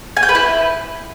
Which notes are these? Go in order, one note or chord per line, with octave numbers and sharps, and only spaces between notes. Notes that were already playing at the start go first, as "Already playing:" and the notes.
G#5
G5
B4
E4